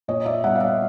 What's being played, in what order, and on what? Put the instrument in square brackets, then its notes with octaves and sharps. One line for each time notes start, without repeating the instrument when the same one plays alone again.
[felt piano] A#2 C#5 D#5
D5 E5
G3 B3 E5 F#5
F5
E5 F#5